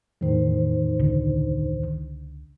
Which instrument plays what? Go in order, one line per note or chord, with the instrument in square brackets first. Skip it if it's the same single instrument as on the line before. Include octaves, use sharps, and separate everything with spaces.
[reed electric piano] E2 A2 D#3 [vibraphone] D#4 C5
[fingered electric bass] C#2 D3